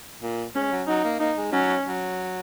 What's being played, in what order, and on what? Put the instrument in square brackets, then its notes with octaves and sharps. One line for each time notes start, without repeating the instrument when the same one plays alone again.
[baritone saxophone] A#2
[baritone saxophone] G#3 [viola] C#4
[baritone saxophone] F#3
[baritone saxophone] F#3 [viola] D#4
[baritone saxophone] A#3
[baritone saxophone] A#3 [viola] D#4
[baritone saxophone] G#3
[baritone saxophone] F#3 [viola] C#4
[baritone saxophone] F#3